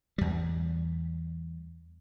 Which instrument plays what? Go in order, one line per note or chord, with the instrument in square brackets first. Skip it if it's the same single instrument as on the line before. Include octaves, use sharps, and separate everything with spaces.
[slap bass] E2 G3